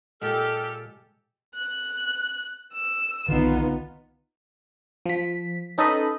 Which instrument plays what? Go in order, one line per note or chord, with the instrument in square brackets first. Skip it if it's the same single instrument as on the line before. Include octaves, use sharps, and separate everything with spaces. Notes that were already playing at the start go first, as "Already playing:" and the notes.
[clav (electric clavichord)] A#2 G#3 D#5 [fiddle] G4 [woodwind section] A4 [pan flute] F6
[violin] F#6
E6 E7
[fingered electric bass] B1 D3 D#3 [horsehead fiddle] B3 D#4 [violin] F4
[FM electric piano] F3 B6
C#4 D#4 A4 B4 D#5 B5